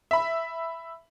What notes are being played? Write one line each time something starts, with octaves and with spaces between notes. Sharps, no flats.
E5 B5